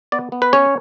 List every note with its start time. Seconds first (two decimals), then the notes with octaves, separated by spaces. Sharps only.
0.12 B3 D5
0.32 B3
0.42 B4
0.53 C#4 C#5